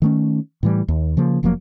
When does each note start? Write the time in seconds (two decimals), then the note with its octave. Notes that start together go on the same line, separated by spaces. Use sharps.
0.02 D#3 A3 C#4
0.63 A2 E3 G3
0.88 D#2
1.17 C#3 F3 A#3
1.43 F1 F3 F#3 A#3